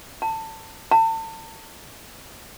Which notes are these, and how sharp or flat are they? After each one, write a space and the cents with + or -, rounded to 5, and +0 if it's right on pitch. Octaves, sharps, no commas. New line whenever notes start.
A5 +20
A5 +35